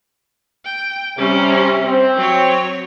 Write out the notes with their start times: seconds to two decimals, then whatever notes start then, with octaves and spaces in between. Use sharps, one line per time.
0.65 G5
1.18 C3 G3 C#4
1.85 C4
2.17 F#3 C#5